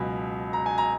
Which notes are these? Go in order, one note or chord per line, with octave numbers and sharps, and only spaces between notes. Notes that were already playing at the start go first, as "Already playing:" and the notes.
Already playing: C#2 B2 F#3 G#5 B5
A#5
G#5
A#5